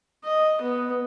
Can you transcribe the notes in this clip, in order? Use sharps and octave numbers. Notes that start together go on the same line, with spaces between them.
D#5
B3